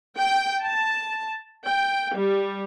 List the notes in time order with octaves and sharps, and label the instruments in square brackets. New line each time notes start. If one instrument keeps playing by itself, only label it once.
[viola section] G5
A5
G5
G3